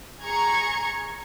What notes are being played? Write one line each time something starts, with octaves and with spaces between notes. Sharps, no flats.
G#4 A#5 C#6 G#6